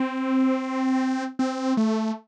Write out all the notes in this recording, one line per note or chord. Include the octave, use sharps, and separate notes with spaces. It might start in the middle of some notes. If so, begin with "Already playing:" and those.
Already playing: C4
C4
A3